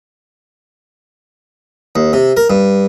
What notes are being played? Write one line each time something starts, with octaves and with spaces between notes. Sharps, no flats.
D#2
C3
A#4
G2